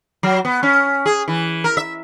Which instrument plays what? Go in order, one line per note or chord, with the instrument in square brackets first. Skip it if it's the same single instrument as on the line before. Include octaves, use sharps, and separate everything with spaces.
[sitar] F#3
B3
C#4
G#4
E3
A#4
E5